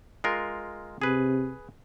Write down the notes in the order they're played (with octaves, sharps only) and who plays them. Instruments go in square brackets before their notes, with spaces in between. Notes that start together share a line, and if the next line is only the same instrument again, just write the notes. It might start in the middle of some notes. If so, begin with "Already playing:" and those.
[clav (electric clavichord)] G#3 F4 A#4
[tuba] C3 [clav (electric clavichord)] G#4 B4